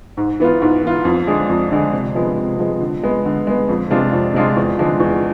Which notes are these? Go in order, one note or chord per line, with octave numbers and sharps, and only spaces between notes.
G#2
E3 B3 F4
G#2
E3 B3 F4
F2
D3 G#3 D4 G#4
F2
D3 G#3 D4 G#4
C3
F3 G#3 B3
C3
F3 G#3 B3
D3
G#3 B3
D3
G#3 B3
F2
C3 G#3 D4 F4
F2
C3 G#3 D4 F4
E2
D3 F3 G#3 D4
E2